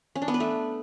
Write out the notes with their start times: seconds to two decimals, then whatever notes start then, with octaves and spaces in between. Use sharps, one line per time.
0.15 C#4
0.22 D4
0.28 B3
0.34 B4
0.40 A3